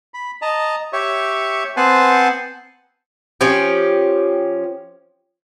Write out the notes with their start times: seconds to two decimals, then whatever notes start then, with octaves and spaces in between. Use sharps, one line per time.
0.14 B5
0.42 D#5 A5 A#5
0.93 G4 C#5 E5 C#6
1.77 B3 C4 C5 F#5 G#5 A5
3.41 F3 C#4 G4